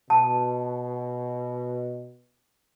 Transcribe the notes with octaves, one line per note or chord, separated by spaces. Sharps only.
B2 A5